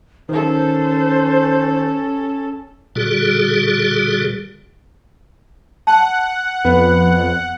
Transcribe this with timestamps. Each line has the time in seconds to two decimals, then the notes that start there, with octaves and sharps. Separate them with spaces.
0.29 D#3 C#4 A4 C5
2.96 A#2 D3 G3 F#4 G#4 A4
5.87 F#5 A5
6.65 F2 B3